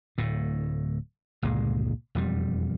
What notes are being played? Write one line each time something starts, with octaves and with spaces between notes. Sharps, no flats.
D1 A2
G1 C#2 A#2 G#3
E1 F2 G3